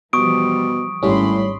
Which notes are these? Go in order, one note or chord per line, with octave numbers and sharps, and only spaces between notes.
B2 E3 F3 G3 C#6 D#6 D7
G#1 A2 G3 C#4 B5 C6